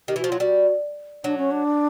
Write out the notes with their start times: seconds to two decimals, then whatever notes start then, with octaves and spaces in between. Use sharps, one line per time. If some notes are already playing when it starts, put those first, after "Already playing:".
0.08 D#3 G4
0.16 E3
0.19 F#4
0.24 F3
0.29 F4
0.32 F#3
0.40 G3 F#4
1.24 F#3 D4
1.38 C#4
1.51 D4